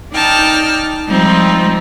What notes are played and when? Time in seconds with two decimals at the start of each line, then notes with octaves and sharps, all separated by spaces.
0.13 D#4 D5 G5 A5 F6
1.07 F3 G3 G#3 C4 D#4 F4